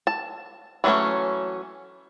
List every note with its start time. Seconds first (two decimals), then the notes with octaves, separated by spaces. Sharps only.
0.07 A5
0.84 E3 F#3 G#3 A3 C#4